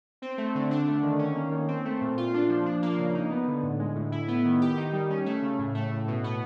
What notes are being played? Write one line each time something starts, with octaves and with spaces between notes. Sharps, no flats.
C4
A3
D3
D4
A3
D#3
C#4
A#3
D#3
C4
A3
A#2
F4
D4
F3
D4
A#3
C#3
D#4
B3
D3
A2
G#3
A2
E4
B3
D#3
G4
D#4
G3
C#4
A3
C#3
A2
A3
A2
B2
B3